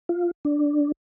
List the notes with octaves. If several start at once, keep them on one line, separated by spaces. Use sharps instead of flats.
F4
D4